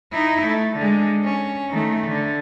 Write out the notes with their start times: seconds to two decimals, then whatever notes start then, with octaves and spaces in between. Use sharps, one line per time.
0.12 D#4 E4
0.48 A3
0.77 D3 G#3
1.24 C#4
1.70 D#3 A3
2.07 D3